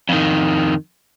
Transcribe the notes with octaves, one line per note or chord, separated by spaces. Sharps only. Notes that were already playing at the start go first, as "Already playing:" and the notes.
F2 D#3